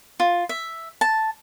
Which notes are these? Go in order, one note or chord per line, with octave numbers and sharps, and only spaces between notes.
F4
E5
A5